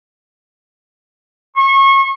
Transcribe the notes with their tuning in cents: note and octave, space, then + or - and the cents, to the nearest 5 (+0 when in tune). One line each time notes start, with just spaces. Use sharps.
C#6 -30